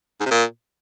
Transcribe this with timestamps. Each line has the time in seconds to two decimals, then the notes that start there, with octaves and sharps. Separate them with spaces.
0.21 G#2
0.26 C3
0.31 A#2